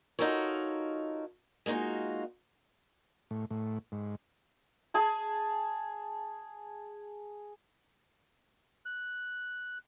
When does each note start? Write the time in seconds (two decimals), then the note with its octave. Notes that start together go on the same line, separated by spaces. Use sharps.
0.19 D#4 F4 F#4 A4 A#4 C#5
1.66 G#3 A#3 D#4 F4 F#4
3.31 A2
3.50 A2
3.92 G#2
4.94 G#4 G#5 A5
8.86 F#6